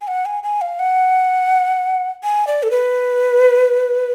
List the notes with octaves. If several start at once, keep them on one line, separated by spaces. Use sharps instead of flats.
G#5
F#5
G#5
G#5
F5
F#5
G#5
D5
A4
B4